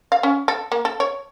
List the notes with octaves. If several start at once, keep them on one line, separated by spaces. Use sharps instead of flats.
F5
C#4
A4
A#3
A4
C#5